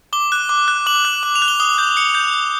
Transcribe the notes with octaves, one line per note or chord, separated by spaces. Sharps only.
D6 G7
F#6
D6
F#6
D6 F#7
F#6
D6 F#7
F7
F#6
G7
D#6 G7
G6
D#6 C#7
G6
D#6